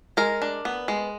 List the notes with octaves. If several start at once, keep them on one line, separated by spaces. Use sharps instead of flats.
G#3 A#4
D4
B3
G#3